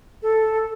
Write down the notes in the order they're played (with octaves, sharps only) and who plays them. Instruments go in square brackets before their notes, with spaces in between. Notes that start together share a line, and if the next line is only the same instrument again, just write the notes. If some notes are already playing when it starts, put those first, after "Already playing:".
[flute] A4